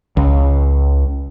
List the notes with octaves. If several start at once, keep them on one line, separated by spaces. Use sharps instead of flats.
C#2